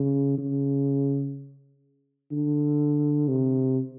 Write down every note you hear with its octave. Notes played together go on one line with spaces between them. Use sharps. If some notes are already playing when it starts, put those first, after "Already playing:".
Already playing: C#3
C#3
D3
C3